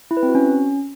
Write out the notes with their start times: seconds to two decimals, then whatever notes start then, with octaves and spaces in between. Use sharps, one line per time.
0.11 E4
0.17 B4
0.23 C4
0.29 F#4
0.35 C#4